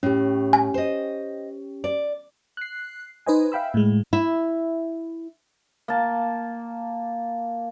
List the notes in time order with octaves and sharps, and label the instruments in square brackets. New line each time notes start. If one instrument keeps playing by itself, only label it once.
[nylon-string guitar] A2 [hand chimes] C#4 G4
[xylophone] G#5
[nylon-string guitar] C5 D#5
D5
[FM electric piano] F#6 C7
D#4 B4 C5 D#5 G#5
E5 F5 G5 B5 E6
A2 G#3
[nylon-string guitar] E4 E5
[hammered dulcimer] A#3 A5